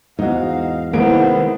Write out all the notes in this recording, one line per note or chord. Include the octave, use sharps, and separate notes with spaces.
E2 G#2 D#4 F#4 F5
C2 A2 D#3 G#3 A#3 B3 C5 D7